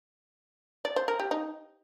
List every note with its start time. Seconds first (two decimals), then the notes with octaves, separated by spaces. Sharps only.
0.85 D5
0.96 C5
1.08 A#4
1.20 G4
1.31 D#4